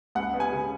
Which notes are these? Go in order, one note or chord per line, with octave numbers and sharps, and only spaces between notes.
C#2 F#5
B3
G#5
C#3